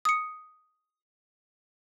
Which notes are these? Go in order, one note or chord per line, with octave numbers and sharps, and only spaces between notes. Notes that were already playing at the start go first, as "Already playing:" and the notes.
D#6 C#7